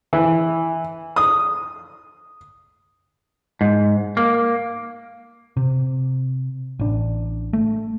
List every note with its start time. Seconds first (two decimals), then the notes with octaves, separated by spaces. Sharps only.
0.13 E3
1.16 D#6
3.61 G#2
4.17 A#3
5.57 C3
6.79 A1 D4
7.53 A3